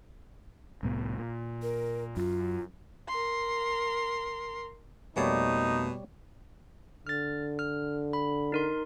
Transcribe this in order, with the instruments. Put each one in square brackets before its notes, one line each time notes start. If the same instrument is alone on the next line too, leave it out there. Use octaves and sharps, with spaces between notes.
[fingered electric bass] C2 A2 B3
A#2
[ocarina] A#4
[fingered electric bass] F#2 [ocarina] F4
[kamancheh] A#4 C6
[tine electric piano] F2 A3 A#3 [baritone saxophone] B2 [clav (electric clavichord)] G3 C#5 D5 [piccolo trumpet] D#4
[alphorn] D3 [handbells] F6 A6
[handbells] F6
B5
D#4 A#4 C6